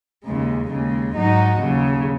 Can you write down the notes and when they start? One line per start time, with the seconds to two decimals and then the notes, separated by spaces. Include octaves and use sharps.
0.24 D#2 C#3 G#3
0.69 D#2 C#3 G#3
1.15 G#2 F#3 D#4 F#4
1.59 D#2 C#3 F#3